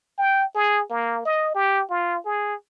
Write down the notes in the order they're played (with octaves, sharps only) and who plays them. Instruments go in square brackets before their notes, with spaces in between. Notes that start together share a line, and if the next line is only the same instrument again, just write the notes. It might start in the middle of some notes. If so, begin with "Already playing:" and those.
[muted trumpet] G5
G#4
A#3
D#5
G4
F4
G#4